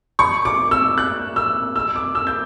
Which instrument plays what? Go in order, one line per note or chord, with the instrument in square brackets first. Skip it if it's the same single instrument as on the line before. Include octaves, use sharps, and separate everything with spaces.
[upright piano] C#6
D6
E6
F#6
E6
E6
D6
E6
G6